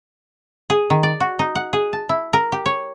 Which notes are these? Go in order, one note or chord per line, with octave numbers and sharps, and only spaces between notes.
G#4
D#3
D5
F#4
D#4
F#5
G#4
A5
E4
A#4
G4
C#5